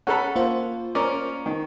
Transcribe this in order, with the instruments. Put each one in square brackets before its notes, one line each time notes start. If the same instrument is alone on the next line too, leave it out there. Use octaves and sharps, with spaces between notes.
[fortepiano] C#4 A4 B5 [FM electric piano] F#5
[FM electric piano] A#3 F4 C5
[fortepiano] C#4 A#4 D5
D#3